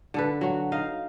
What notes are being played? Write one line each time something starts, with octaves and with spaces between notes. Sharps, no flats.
D3 A4 B4
F#3 F#4
D#4 D#5 F5